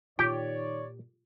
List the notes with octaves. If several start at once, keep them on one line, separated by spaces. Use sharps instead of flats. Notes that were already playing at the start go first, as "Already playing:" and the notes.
A#2 D#3 F4 G4 C#5 D5 G5